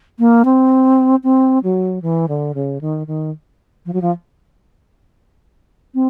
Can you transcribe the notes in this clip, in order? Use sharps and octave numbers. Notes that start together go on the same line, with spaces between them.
A#3
C4
C4
F#3
E3
D3
C#3
D#3
D#3
F3
F#3
F3
C4